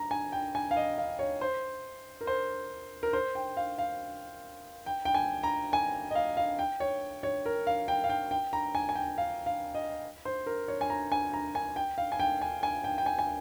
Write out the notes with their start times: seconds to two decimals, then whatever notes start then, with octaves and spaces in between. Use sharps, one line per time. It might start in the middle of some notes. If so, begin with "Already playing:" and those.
Already playing: A#5
0.11 G#5
0.32 G5
0.55 G#5
0.71 F5
0.77 D#5
0.98 F5
1.19 C#5
1.41 C5
2.21 A#4
2.27 C5
3.03 A#4
3.13 C5
3.35 G5
3.57 F5
3.78 F5
4.86 G5
5.05 G5
5.14 G#5
5.43 A#5
5.73 G#5
6.11 D#5
6.15 F5
6.37 F5
6.59 G5
6.80 C#5
7.23 C#5
7.46 A#4
7.67 F5
7.88 G5
8.04 F5
8.10 G5
8.31 G5
8.53 A#5
8.75 G#5
8.89 G#5
8.95 G5
9.18 F5
9.46 F5
9.75 D#5
10.25 C5
10.46 A#4
10.68 C#5
10.81 G#5
10.90 A#5
11.12 G#5
11.33 A#5
11.55 G#5
11.76 G5
11.98 F5
12.12 G#5
12.20 G5
12.42 G#5
12.63 G#5
12.84 G5
12.98 G5
13.06 G#5
13.19 G#5